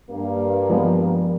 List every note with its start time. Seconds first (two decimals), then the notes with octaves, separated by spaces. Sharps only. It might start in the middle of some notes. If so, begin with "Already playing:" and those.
0.10 G2 A#3
0.70 F3 G#3 B3